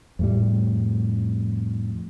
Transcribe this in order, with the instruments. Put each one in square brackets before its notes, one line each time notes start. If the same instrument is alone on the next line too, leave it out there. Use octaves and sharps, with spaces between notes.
[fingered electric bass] F2 A2 G3